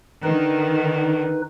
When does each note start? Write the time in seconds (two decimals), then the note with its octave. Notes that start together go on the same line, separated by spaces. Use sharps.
0.23 D3 D#3 D#4 B4